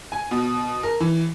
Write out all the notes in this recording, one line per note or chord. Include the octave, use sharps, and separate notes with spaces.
G#5
B2
A#4
E3